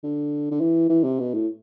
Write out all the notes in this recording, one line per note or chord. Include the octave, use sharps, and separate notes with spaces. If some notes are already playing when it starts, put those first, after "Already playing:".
D3
D3
E3
E3
C3
B2
A2